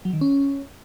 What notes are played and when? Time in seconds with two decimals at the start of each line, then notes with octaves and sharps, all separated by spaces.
0.05 F#3
0.13 D#3
0.21 C#4